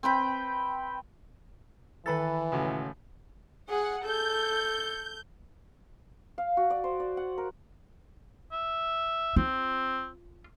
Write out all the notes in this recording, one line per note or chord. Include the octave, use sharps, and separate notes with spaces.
C4 B4 G5 B5
D#3 E3 A4 B4 B5 A6
C#2 A2 F#4
G#4 F#5
A4 G6
F5
F#4
D5
C5
D5
F#5
A#4
E5
C4 F4